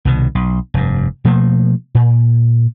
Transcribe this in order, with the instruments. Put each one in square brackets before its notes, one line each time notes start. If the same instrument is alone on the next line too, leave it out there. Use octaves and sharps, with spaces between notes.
[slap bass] C2 B2 D#3
B1
F1 G2
B2 F3 A3 A#3
A#2